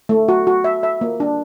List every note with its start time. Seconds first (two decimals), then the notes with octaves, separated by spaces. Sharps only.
0.09 A3
0.29 F#4
0.47 F#4
0.64 E5
0.83 E5
1.01 A#3
1.20 D4